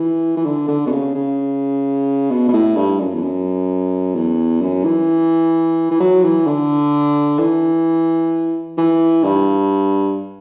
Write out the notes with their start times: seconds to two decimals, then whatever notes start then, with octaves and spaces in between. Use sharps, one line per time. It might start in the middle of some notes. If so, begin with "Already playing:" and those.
Already playing: E3
0.37 E3
0.45 D3
0.68 D3
0.87 B2
0.91 C#3
1.15 C#3
2.30 B2
2.48 B2
2.53 A2
2.76 G2
3.00 F#2
3.14 E2
3.23 F#2
4.15 E2
4.61 F#2
4.84 E3
5.91 E3
6.00 F#3
6.23 E3
6.47 D3
7.39 E3
8.77 E3
9.24 G2